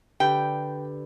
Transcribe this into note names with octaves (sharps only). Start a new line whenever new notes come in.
D3 G4 B4 G5